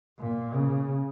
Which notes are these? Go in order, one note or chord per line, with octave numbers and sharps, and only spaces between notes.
A#2
C#3